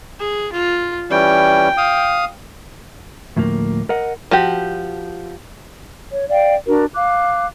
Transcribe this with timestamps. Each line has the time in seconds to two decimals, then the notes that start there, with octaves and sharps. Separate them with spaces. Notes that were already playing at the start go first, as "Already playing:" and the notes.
0.19 G#4
0.52 F4
1.11 E3 G3 C#4 G5
1.77 F5 D#6
3.36 D2 A2 F3 A#3
3.89 A#4 D#5 F#5
4.31 F3 F#4 G4
6.12 C#5
6.30 D5 F5 G5
6.68 D4 F#4 A#4
6.94 F5 D6 F#6